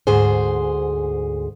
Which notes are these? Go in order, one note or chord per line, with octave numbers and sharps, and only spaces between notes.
D2 G#2 G#4 C5